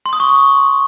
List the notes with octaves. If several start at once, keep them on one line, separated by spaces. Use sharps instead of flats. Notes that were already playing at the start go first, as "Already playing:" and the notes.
C6
D#6
C#6